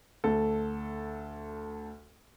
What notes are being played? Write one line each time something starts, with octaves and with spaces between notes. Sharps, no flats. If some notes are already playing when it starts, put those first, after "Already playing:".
D2 A4